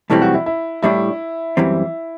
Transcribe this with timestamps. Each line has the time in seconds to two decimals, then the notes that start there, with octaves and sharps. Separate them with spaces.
0.10 B1 A2 E3 G3 C4 A4
0.22 F#4
0.34 E4
0.46 E4
0.83 A2 G3 D4 E4
1.57 F#2 E3 G3 C4